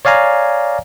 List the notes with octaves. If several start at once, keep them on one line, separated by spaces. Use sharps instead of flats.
C#5 D5 F5 G#5 A#5